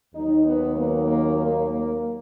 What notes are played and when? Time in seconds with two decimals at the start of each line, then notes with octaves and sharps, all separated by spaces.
0.14 D#2 D#3 F#3 D#4
0.45 B3
0.75 A#3
1.06 A#3
1.37 A#3
1.67 A#3